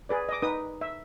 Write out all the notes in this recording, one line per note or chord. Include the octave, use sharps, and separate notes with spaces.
G#4 B4 D5
D#5 D6
D#4 B4 D#6
E5